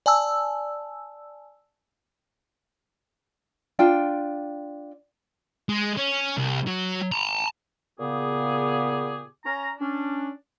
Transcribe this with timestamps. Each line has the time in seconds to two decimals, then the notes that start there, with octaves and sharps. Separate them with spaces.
0.06 D5 G#5 A5 E6
3.79 D4 F4 G5
5.69 G#3
5.97 C#4
6.37 C2
6.67 F#3
7.12 A5 A#5
7.99 A#2 C#3 B3 G4 G#4
9.44 C#4 A#5
9.80 C#4 D4